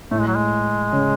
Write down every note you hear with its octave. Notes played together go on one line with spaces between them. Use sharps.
A2 A3
G#3
F#3
G#3
C#3